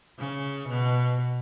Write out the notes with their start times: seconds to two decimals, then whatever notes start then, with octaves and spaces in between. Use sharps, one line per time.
0.19 C#3
0.68 B2